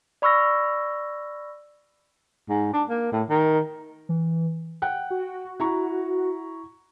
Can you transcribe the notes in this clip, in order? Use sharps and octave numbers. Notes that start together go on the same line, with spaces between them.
D5 B5 C#6 E6 F6 A#6
G#2
D4
A#3
A2
D#3
E3
F#5 G5 F#6
F#4
E4 A#5 C#6